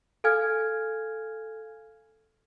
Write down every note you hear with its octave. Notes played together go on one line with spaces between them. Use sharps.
A4 F5 G#5 F6 G#6